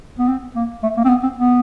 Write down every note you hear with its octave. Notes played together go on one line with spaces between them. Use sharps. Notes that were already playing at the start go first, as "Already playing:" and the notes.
B3
C4
A#3
A3
A#3
C4
B3
C4
B3